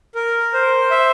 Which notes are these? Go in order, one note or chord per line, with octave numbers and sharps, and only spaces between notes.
A#4
C5
E5